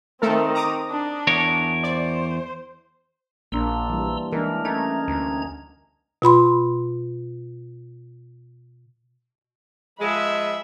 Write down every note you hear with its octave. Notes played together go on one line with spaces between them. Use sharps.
D#3 A3 C4 A4 A#4
A#5 D6 D#6
D4
E2 A#4 C#5
C5 D5
A#1 A#3 D4 A#5 C6 E6
E3 G3
E3 G#3 D4 D#4 A#4
A3 C#4 D#4 A#5 G#6
D2
B2 F4 B5 C6
F3 G#3 E5 B5